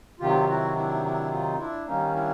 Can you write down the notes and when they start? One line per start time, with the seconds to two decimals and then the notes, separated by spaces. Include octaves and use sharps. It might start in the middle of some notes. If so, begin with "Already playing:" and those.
0.20 C3 D#3 F#3 F4 G4
0.48 E4 F#4
0.76 D4 E4
0.93 D#4
1.03 D4 E4
1.31 D#4 F4
1.59 D4 E4
1.87 D#3 G3 A#3 C#4 D#4
2.14 D4 E4